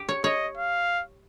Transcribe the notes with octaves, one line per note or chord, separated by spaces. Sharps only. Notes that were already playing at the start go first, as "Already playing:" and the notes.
Already playing: G4
C#5
C#5 D#5
F5